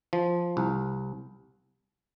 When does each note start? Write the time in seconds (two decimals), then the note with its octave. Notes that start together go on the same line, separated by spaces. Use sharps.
0.13 F3
0.57 C2